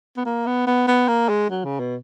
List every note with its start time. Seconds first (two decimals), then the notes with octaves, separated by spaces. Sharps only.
0.17 B3
0.25 A#3
0.46 B3
0.67 B3
0.87 B3
1.08 A#3
1.29 G#3
1.50 F#3
1.65 C#3
1.80 B2